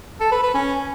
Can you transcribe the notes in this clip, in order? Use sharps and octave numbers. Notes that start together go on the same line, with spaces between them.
A4
B4
B4
C#4